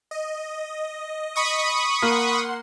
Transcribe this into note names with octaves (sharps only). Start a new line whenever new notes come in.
D#5
B5 C#6 D#6
A#3 F#5 C6